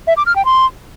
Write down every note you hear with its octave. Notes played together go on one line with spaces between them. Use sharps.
E5
D6
F6
G5
C6